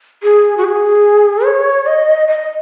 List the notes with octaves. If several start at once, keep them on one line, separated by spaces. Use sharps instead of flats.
G#4
F#4
G#4
C#5
D#5
D#5